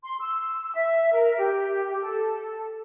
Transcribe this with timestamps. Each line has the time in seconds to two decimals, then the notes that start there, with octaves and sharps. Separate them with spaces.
0.03 C6
0.20 E6
0.74 E5
1.13 A#4
1.37 G4
2.01 A4